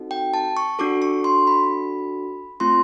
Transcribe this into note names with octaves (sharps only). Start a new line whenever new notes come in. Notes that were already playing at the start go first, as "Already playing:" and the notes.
Already playing: C4 D#4 F#4 A4
G5
A5
C#6
D4 F#4 A4 D6
C#6
C6
B5
A3 C4 F4 C6